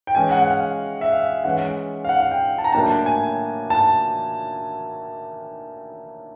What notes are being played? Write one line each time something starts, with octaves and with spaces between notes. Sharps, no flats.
G5
E3 G#3 C#4 G#5
F#5
F#5
F5
E5
F5
E3 G#3 C#4 F#5
F5
F#5
F5
G5
A5
A#5
A2 F#3 A#3 D4 A5
G#5
A5